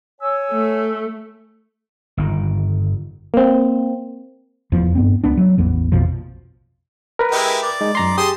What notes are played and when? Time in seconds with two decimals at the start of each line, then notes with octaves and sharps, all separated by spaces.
0.21 C#5 G#5 E6
0.52 A3
2.17 G1 D#3
3.34 A#3 C4
4.72 F1 E2 F3
4.95 G2 B3 C4
5.24 C#2 B3 D4
5.37 F#3
5.57 A1 E2 E3 B3
5.92 A#1 F2 B2 F3
7.19 A#4 B4
7.32 G#3 E4 G4
7.63 D5
7.81 G#3 D#4
7.95 F#2 A#5 C6
8.18 G4 G#4 A5 C6 D#6